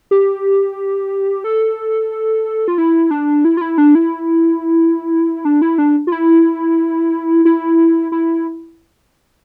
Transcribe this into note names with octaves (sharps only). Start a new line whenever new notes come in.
G4
A4
F4
E4
D4
E4
F4
E4
D4
E4
D4
E4
D4
F4
E4
E4
E4